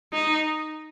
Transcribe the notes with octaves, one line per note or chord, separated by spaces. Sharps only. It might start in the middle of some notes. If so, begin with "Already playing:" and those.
D#4